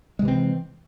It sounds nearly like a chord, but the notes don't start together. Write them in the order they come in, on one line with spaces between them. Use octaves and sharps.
G#3 C3 E3 C4